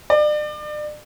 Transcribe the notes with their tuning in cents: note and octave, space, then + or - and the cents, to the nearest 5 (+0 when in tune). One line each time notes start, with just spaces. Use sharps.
D5 +35